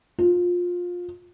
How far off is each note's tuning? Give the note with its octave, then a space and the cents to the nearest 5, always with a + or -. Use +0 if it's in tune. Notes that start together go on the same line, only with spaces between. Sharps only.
F4 +20